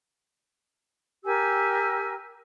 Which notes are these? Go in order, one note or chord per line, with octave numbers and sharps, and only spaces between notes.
G4 A#4 G#5 E6